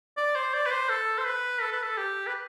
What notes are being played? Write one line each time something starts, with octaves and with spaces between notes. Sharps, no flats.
D5
C5
D5
B4
C5
A4
C5
B4
A4
B4
A4
G4
B4